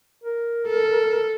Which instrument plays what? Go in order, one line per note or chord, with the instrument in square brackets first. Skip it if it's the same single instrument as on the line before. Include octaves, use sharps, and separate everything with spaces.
[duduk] A#4
[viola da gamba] A4